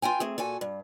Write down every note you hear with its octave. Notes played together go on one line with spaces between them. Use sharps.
F4 B4 G5 G#5
A3 C4 G#4
A#2 F#4 A4 G#5
G2